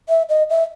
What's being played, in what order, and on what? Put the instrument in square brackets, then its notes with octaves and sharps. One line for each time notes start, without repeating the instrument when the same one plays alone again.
[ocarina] E5
D#5
E5